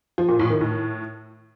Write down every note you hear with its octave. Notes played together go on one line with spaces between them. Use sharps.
F3
A#2
A2
D#3
A2